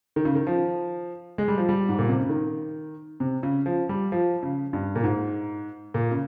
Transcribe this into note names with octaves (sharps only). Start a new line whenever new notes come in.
D#3
C#3
D#3
F3
G#3
G3
F3
G3
G#2
A#2
C3
C#3
D#3
C3
C#3
F3
G3
F3
C#3
G2
A#2
G#2
A#2
C#3